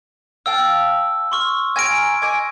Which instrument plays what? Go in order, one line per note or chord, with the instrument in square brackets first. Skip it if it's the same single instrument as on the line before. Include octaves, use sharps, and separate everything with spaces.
[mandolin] F5 G5 A5 [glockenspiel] E6
[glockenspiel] C6 C#6 F6
[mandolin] G#5 A#5 F6 [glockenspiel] G#6 D7
[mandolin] D#5 G#5 D6